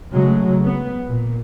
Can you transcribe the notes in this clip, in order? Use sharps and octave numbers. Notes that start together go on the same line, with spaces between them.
C#3 F#3 G#3 A3
B3
A#2